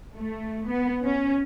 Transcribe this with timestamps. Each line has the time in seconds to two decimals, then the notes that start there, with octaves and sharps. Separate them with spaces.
0.16 A3
0.68 B3
1.04 C#4